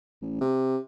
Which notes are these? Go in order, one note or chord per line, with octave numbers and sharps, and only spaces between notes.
A1
C3